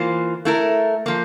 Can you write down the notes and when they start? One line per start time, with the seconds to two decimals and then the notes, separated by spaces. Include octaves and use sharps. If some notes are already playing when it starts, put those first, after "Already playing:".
Already playing: E3 A#3 F4 C5
0.45 A3 E4 A#4
1.06 F3 A#3